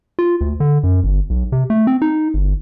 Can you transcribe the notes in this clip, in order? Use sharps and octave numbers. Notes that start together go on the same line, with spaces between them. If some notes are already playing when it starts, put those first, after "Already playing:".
F4
D2
D3
F#2
G1
B1
C3
A3
C4
D#4
G1